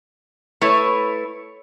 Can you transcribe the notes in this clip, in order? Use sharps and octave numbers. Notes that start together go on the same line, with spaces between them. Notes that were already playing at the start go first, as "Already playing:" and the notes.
A3 E4 B4 C#5